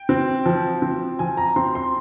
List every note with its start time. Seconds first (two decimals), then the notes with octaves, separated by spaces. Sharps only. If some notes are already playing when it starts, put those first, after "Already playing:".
Already playing: G5
0.09 C4
0.46 F3
0.82 C4
1.19 F3 G#5
1.37 A#5
1.56 C4 C6
1.75 C6